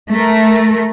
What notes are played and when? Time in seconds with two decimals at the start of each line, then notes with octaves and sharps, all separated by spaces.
0.10 A3 A#4